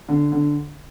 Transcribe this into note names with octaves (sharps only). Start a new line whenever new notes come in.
D3
D3